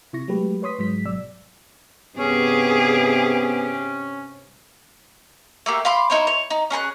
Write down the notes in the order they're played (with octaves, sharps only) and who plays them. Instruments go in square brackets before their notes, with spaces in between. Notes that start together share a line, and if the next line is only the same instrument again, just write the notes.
[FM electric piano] C3 E4 C#6 A#6
F#3 G#3 A3 G4 B4
B4 C#5 C6 D#6 B6
G#2 F#3 G#3 B6
G#1 B2 F#3 D5 E6
[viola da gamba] G2 C3 G4 [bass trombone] B3 [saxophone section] C#4 [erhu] G#4
[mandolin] A3 A#3 G4
F5 B5 C6 D6
D#4 E4 C5 C#5
C#5
D#4
C#4 G#4 A#5 F#6